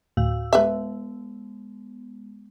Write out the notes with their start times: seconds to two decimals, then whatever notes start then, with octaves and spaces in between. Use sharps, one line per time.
0.17 D2 A2 F#4 F5 E6
0.53 G#3 B3 B4 E5